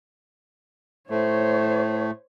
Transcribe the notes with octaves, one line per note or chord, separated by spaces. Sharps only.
A2 A3 C5 C#5